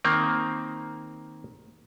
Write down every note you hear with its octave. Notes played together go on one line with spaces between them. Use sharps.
D#3 A#3 C4